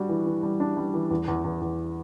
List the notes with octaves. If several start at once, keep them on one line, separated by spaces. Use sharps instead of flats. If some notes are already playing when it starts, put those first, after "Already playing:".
Already playing: G3 D4 F#4
E3
E3
G3
D4
G3
E3
E2
E2
E2
E2